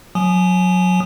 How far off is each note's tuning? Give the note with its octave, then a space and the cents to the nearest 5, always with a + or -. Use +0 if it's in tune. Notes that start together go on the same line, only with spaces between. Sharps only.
F#3 -25 G#5 +25 D#6 -20